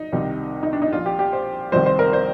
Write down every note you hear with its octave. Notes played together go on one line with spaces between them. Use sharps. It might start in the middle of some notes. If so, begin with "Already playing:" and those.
Already playing: D#4
C2 C3 D#3
D#4
D4
D#4
A#1 A#2 F4
G4
G4
C5
C2 C3 D#3 C5
C5
A#4
C5